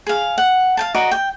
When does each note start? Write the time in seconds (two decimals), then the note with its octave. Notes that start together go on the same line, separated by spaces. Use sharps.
0.07 G#4 F5
0.38 F#5
0.77 F5 G5 A5
0.94 F#4 D5 D#5 A#5
1.11 G5